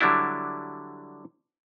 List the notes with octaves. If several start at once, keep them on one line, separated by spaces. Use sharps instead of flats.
D3 F#3 G3 D4 E4